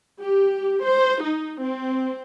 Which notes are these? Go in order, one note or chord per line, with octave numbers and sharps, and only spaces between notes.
G4
C5
D#4
C4